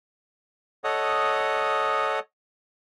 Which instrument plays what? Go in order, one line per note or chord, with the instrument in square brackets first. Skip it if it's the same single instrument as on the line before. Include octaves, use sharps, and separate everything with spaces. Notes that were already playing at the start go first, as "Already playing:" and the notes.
[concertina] A4 C#5 D#5 F#5 D#6